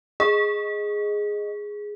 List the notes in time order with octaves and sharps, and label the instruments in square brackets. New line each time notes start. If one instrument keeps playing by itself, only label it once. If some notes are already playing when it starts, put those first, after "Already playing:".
[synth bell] G#4 [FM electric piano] D#5